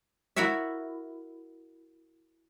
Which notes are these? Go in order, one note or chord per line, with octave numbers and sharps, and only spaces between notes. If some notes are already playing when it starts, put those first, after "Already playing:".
E4 F#4 A#4 C#5 E5